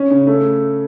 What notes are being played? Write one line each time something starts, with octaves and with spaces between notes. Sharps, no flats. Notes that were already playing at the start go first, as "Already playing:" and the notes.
Already playing: C#4
C#3
A3